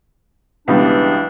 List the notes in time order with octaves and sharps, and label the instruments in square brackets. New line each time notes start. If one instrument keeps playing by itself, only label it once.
[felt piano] C#2 B2 G3 [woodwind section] E3 D4